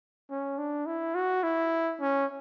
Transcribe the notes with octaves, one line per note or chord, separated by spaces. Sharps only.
C#4
D4
E4
F#4
E4
C#4